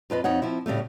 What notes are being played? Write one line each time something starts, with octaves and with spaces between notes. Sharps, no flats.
F2 F4 B4 D#5
F2 D#4 C#5 F#5
F3 C4 E4
A2 C#3 G3 A3